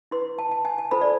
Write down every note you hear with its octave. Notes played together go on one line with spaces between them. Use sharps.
E4 B4 C6
A5
A5
G#5
A5
F4 A4 C5 B5
D5